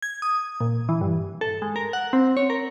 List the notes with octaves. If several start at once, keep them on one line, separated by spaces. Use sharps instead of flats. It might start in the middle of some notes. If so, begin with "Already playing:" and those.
G#6
D#6
A#2
E3
G2
A4
G#3
A#4
F#5
C4
C#5
A#4